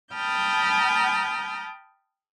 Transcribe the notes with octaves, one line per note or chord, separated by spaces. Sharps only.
G5 A5 B5 D#6 F6 G6